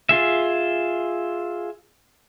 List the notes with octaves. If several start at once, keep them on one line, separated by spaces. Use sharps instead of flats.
F4 G#4 E5